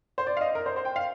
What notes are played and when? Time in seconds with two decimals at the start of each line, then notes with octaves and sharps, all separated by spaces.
0.18 C5
0.27 D5
0.37 F5
0.41 D#5
0.55 A#4
0.66 C5
0.76 C5
0.85 G5
0.96 F5